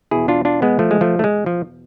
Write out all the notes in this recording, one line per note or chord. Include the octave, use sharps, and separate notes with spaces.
E2 B2 E4 G#4
D4 F4
D4 F4
G#3 B3
F3 A3
G#3
F3 A3
A3
G#3
F3